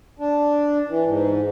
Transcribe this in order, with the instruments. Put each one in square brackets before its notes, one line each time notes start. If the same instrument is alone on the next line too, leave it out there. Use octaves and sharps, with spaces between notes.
[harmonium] D4
E3
G#2